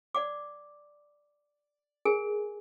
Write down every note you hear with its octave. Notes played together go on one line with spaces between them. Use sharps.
D5 F#5 D6
G#4 A#4 G#5